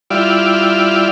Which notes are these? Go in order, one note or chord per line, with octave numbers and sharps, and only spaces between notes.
G3 E4 F4 D5